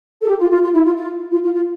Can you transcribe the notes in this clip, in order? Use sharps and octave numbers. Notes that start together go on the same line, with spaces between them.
A4
G4
F4
F4
F4
E4
F4
F4
F4
F4
F4